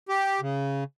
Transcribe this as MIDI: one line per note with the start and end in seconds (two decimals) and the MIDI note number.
0.09 0.41 67
0.41 0.84 49